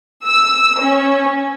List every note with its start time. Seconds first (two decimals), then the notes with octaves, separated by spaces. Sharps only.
0.25 E6
0.80 C#4